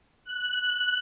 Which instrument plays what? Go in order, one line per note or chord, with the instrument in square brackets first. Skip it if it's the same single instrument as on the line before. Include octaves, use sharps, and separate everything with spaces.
[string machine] F#6